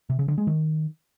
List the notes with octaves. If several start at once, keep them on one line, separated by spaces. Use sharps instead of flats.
C3
C#3
D3
G#3
D#3